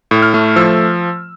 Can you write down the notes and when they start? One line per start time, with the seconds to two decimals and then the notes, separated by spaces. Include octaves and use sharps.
0.11 A2
0.22 F6
0.34 A3
0.56 F3 E6